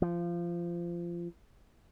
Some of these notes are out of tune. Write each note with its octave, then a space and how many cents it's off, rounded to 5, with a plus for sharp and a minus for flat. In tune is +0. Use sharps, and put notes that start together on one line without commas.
F3 -20